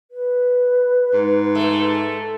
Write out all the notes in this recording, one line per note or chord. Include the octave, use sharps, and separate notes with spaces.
B4
G#2
A3